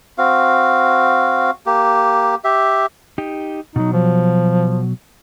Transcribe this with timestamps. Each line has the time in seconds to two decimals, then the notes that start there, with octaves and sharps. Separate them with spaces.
0.18 C4 F#4 F5
1.66 A#3 G4
2.44 G4 E5
3.18 D#4 G4
3.76 B2 F#3 D#4
3.93 F3